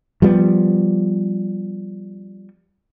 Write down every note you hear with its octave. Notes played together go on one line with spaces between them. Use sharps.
F3 G3 A3 B3